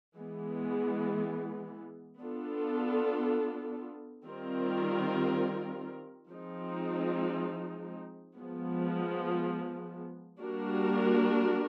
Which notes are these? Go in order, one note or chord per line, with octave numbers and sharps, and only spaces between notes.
E3 G#3 B3
B3 D4 F4 A4
D#3 G3 C4 F4 A#4
F3 G#3 C4 D#4
F3 G#3 B3
G3 A#3 D4 F#4 A#4